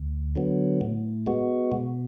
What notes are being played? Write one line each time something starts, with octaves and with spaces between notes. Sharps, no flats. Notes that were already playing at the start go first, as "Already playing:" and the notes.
Already playing: D2
D3 F#3 B3
A2
G#3 B3 F#4
B2